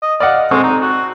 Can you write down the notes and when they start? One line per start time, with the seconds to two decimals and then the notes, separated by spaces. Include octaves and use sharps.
0.02 D#5
0.20 D5 D#5 F5 F#5
0.51 G#3 C4 A4 C#6
0.63 D#4
0.82 F#4